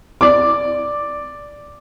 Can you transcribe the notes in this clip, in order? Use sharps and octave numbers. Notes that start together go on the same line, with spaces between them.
D5 D6